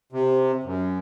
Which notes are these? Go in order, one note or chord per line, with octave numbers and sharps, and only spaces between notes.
C3
F#2